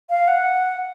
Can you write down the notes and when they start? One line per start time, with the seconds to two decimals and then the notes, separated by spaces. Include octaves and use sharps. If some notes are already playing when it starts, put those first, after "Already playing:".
0.10 F5
0.28 F#5